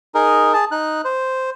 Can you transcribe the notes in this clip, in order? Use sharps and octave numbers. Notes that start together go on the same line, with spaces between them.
D#4 G#4 A#4
G#4 A5
D#4 F#6
C5